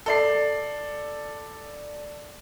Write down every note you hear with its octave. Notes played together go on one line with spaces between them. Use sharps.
A4 D5 C7